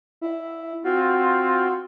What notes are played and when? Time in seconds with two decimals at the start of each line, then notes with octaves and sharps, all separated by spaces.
0.21 E4
0.84 C4 F4 F#4